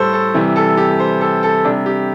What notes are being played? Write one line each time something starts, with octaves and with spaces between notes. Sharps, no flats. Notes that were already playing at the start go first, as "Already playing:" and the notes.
Already playing: A2 G3 A4 C5
A4
C3 E3 G3
A4
G4
C5
A4
A4
C3 G3 D4
G4